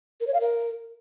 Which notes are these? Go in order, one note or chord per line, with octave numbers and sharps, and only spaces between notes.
A#4
C#5
F5
A#4